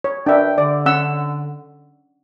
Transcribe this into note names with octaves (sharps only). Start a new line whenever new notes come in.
C#5
F#2 D4 B4 E5 G5
D3 D5
C#4 F#5 E6